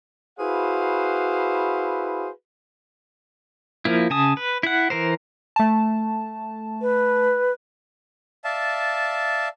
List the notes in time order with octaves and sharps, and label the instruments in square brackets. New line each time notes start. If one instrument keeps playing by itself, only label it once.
[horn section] E4 F#4 G#4 B4 C5 F5
[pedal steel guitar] F3 A#3 E4
C#3 G#5 A5 D#6
B4
E4 F#5
E3 A#4 C5
[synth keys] A3 A5
[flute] B4
[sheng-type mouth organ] D5 E5 F5 A5